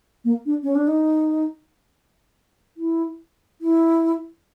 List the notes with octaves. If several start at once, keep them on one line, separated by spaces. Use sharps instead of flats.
A#3
D4
C#4
D4
D#4
E4
E4